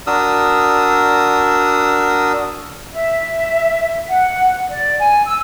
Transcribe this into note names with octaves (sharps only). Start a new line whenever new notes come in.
D4 F#4 A#4 D#6 E6
E5
F#5
D5
G#5
E6